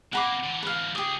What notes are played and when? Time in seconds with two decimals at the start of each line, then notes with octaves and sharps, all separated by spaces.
0.13 C3 A#3 F#5 B5 D6
0.44 D3 E3
0.63 B4 F5
0.95 C#2 G4 G#4 D#6